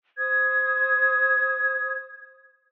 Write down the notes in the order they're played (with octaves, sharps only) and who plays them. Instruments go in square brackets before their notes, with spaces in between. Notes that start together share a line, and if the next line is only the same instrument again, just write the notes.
[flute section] C5 D#6 G#6